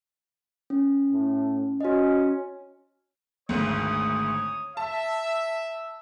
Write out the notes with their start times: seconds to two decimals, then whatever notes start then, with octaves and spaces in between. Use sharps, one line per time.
0.70 C#4
1.11 A2
1.81 C#4 F#4 D#5
3.49 G#1 D2 C#5 D#6
4.77 E5 A5